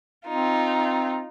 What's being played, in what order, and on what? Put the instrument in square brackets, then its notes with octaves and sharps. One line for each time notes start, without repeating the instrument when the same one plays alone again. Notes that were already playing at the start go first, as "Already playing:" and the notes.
[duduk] C4 [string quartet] D#4 F4